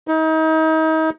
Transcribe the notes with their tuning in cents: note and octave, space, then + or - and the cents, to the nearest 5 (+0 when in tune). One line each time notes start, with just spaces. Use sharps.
D#4 +35